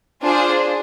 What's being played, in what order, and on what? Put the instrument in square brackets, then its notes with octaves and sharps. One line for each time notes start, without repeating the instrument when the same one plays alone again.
[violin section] D4 F4 G#4 C5